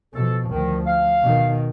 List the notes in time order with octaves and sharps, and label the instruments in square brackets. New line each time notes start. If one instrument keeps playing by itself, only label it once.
[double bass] B2 F3 [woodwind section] A4
[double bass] D2 F3 [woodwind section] D#3
[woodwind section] F5
[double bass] B2 D#3